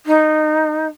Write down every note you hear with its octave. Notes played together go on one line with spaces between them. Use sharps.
D#4